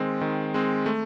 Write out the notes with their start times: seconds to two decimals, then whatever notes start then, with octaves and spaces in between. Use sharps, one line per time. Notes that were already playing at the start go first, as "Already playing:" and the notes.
Already playing: D#3 G#3 C4
0.21 D#3
0.54 G#3 C4
0.86 A3